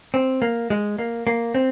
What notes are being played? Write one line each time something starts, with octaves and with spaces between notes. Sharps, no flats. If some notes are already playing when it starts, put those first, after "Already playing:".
C4
A#3
G#3
A#3
A#3
C4